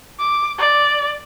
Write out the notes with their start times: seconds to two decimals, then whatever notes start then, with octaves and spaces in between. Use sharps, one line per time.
0.19 D6
0.58 D5